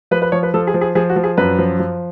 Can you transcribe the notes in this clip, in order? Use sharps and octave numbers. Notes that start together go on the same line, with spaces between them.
F3 B4
B4
F3 C#5
B4
F3 A4
G#4
F3
G#4
F3 G#4
F#4
F3
G#4
F#2 B4
F3
F3